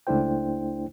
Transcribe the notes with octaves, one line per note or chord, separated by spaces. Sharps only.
C#2 A3 D4 E4 C5 G5